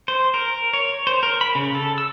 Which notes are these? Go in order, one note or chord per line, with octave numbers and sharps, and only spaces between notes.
C5
A#4
C#5
C5
A#4
B5
C#3
A4
E6